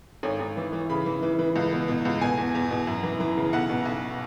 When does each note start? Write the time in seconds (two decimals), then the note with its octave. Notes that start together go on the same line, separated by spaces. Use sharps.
0.23 G#1 C#5
0.40 G#1
0.57 E3
0.73 E3
0.89 C#3 B5
1.06 E3
1.22 E3
1.39 E3
1.55 C#2
1.72 B2
1.88 B2
2.05 C#2
2.21 B2 G#5
2.37 E2
2.55 E2
2.71 B2
2.87 F#2
3.03 E3
3.20 E3
3.37 C#3
3.53 B1 F#5
3.69 B2
3.85 B1